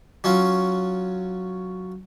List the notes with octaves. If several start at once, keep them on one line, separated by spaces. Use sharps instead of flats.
F#3 C#4 F4